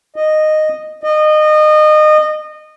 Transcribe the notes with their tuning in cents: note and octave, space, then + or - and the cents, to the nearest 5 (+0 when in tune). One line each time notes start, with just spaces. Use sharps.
D#5 -10
D#5 -25